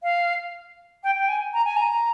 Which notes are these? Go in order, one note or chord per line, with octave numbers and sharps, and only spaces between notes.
F5
G5
G5
G#5
A#5
G#5
A#5